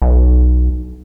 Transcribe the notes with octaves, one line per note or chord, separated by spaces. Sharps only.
B1